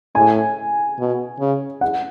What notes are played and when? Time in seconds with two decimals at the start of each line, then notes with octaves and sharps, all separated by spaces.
0.15 A2 G#5
0.99 B2
1.40 C#3
1.81 F#5